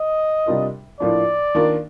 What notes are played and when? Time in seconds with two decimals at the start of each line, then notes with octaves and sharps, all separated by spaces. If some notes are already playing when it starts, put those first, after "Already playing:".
Already playing: D#5
0.46 C3 G3 D4 F4 A#4
1.00 A2 F3 A#3 D4 D5
1.55 D#3 A#3 D4 F4 A#4